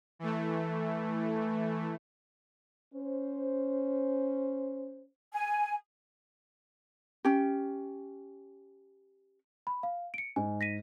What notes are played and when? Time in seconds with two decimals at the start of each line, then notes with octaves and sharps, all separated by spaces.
0.19 E3 A3
2.94 C#4 C5
5.32 G#5
7.25 C#4 G4
9.67 B5
9.83 F5
10.14 C#7 D7
10.36 G#2 G#5
10.61 A#6 B6 D#7